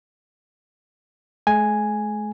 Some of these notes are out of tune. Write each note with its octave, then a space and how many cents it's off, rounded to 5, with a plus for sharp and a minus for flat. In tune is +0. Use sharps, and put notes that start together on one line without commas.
G#3 +45 G#5 +0